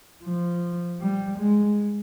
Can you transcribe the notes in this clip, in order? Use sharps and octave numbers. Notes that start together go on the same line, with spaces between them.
F3
G3
G#3